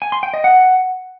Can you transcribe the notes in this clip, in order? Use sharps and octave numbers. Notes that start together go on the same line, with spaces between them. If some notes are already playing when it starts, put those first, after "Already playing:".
G#5
C6
G5
D#5
F#5